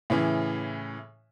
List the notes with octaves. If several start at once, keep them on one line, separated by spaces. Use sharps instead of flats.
A2 C#3 E3